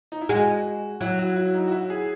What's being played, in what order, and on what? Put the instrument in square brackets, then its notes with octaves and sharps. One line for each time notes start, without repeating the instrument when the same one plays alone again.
[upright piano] D#4
E4
[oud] G#3 [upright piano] F#4
[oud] F#3 [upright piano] E4
[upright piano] F#4
E4
D#4
F#4
E4
G#4